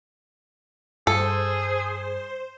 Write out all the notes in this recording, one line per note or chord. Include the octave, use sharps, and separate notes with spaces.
G2 G#4 A4 C5